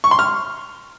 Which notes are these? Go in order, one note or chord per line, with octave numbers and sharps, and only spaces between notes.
C#6
C6
F6